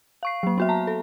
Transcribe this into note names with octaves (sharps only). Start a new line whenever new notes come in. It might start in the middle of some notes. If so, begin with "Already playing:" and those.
F5 C#6 C7
F#3 A#3
B3 F#4 E5
A5 A#5
A4